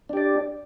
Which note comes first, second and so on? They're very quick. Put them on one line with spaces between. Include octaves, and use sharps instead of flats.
D4 G4 D5